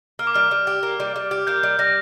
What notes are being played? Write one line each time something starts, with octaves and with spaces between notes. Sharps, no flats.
A#3 F6
D6
G3 F6
G3
G4
A#3
G3
G3
G4
A#3 G6
G3
G3 A#6